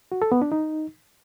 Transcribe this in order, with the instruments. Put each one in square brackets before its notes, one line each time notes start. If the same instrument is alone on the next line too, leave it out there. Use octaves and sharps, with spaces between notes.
[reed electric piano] F#4
A4
B3
D4
D#4